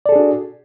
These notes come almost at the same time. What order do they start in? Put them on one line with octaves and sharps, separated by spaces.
D5 A4 G#4 D4 F#4